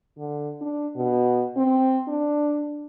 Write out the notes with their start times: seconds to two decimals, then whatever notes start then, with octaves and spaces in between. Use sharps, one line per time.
0.18 D3
0.61 D4
0.96 B2
1.57 C4
2.08 D4